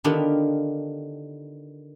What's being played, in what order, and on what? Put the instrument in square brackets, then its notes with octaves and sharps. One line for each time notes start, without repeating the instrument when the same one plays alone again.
[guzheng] D3 D#3 B3 D4 F4 G4